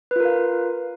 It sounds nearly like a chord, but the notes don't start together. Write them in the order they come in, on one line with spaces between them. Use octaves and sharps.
B4 F4 A#4 F5